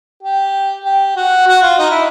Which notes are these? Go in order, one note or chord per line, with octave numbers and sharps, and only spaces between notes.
G4
G4
F#4
F#4
F4
D#4
E4